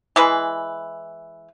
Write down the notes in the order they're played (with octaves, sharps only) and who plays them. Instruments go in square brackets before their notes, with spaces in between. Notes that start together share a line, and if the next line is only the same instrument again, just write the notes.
[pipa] E3 G#3 B4